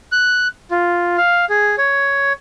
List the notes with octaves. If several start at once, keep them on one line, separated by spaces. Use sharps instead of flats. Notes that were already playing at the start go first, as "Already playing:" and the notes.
F#6
F4
F5
G#4
C#5